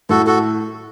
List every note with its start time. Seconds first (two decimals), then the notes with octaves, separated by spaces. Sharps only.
0.09 A2 F#4 A4
0.27 F#4 A4